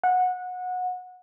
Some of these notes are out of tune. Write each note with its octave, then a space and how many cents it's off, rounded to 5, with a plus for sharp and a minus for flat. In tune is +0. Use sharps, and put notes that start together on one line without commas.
F#5 -20